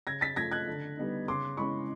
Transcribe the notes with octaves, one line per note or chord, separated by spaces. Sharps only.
C#3 G#6 A#6
A6 B6
F3 A3 G#6 A#6
F#6 G#6
D3
G3 B3 D#4
C#3 C6 D6
E3 G#3 C#4 B5 C#6